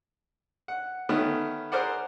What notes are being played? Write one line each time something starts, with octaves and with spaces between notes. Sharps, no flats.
F#5
D#3 A3 B3 C#4
G#4 A#4 C5 D5 F#5